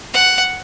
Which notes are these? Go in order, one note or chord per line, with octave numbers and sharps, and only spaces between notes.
F#5